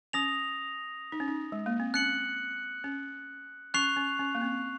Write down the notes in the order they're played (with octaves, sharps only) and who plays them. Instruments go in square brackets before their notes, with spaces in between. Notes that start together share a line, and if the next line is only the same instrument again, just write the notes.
[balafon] C#4 [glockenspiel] D#6 A#6 F7
[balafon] D#4
C#4
D#4
G#3
A#3
C4
[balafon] C#4 [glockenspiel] F#6 C#7 F#7
[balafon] C#4
[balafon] C#4 [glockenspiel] C#6 F#6 C7 F7
[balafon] C#4
C#4
A#3
C4